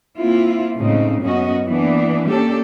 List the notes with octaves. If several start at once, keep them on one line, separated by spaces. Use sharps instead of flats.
A#3 C4 E4 F4
A2 C#3 G#3 C4 D#4
F#2 F#3 B3 C#4 F#4 D#5
E3 A#3 B3 D4
A#3 C#4 D4 G4 A4